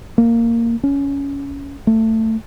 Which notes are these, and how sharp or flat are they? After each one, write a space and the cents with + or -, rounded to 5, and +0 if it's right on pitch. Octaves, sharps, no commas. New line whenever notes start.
A#3 -10
C#4 +15
A3 +20